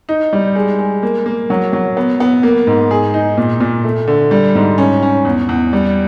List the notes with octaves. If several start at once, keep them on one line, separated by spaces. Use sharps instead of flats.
D#4
G3
G#3
G#3
A#3
A#3
F#3
F#3
B3
B3
A#3
G#2
G#4
D#4
A#2
A#2
A3
D3
G3
G#2
C#4
C#4
E2
E2
G3